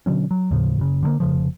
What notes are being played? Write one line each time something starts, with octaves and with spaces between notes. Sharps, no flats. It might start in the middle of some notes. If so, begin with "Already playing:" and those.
B2 D3 F#3 C#4
F#3
D#2 A2 C#3 F3
F#1 C#3
D3 D#3 A#3
F1 C#3 F3